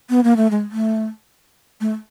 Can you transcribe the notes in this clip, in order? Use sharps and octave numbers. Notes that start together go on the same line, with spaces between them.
B3
A#3
A3
G#3
A3
A3